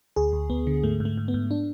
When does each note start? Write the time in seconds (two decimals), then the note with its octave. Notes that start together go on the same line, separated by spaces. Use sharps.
0.16 D2 G#4
0.33 D2
0.50 D2 B3
0.67 D3
0.83 G#2 A3
1.00 G#2
1.05 A3
1.17 G#2
1.28 B3
1.34 G#2
1.51 D4